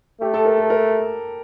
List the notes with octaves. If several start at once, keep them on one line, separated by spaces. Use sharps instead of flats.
A3 G4
A4
A#4
A4
A#4